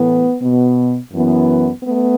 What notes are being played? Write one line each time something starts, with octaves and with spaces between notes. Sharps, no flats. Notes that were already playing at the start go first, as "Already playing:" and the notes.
Already playing: A2 E3 A3 B3
B2 B3
F#2 E3 B3
A3 B3